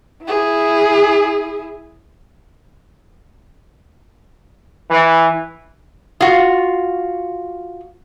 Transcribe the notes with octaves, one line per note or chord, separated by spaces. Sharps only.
E4 G#4
E3
F4 F#4